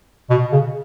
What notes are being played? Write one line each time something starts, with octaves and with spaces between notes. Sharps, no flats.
B2
C#3